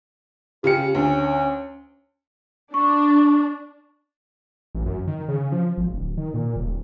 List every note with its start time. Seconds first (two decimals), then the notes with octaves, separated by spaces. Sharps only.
0.64 C#3 F4 G4 C#7
0.95 D2 C#4
2.74 D4 C#6
4.75 A1
4.86 F#2
5.07 D#3
5.29 C#3
5.52 F3
5.78 G#1
5.92 D1
6.17 D#3
6.34 A#2
6.56 D#1